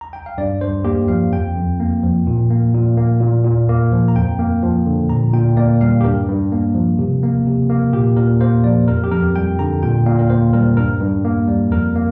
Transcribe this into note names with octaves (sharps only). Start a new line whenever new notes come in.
A#5
G5
F5
G2 D5
G2 C5
A#3 G4
F3 F5
F2 G5
F2
A#3
F3
A#2
A#3
A#2
A#3
A#2
A#2
A#3
F3
A#5
F2 G5
A#3
F3
D3
A#2 A#5
A#2 G5
A#3 D5
G3 F5
G4
G2 A#4
G2
A#3
F3
C3
A#3
C3
A#3
A#2 G4
A#2 A#4
A#3 C5
F3 D5
F2 A#4
G4
F2 A#4
G3 G5
D3 A#5
A#2 G5
A#2 F5
A#4
A#3 C5
G3 A#4
G2 A#4
G2
A#3
G3
F2 A#4
A#3